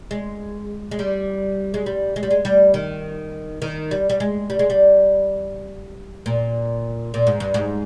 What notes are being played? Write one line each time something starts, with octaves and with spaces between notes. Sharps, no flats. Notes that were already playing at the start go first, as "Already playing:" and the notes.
G#3
G#3
G3
G#3
G3
G#3
G3
G#3
G3
D#3
D#3
G3
G3
G#3
G3
G#3
G3
A#2
A#2
G#2
G2
G#2